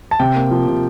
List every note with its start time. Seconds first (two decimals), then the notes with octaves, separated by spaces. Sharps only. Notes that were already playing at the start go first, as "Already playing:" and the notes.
0.11 A5
0.20 C3 G5
0.36 A#3
0.51 F3
0.68 C3